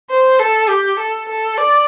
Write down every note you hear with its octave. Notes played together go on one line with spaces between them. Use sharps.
C5
A4
G4
A4
A4
D5